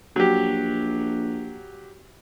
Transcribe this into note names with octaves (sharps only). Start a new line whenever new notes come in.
A#1 F#3 G4